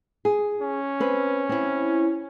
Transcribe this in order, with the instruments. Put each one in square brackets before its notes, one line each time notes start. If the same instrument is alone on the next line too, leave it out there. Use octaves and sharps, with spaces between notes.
[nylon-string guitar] G#4
[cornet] C#4
[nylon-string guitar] C4 B4
C4 E4